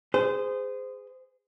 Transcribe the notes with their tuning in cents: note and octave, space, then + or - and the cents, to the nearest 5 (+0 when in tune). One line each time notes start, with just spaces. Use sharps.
G#4 -10 C5 -25